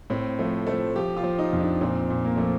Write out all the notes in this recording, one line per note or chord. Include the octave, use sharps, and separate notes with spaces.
A2 C4
F3 A3
F3 A3
F3 G4
F4
F3
D#4
F2
D4
A#2 C4
A#2
A#3
F3 A3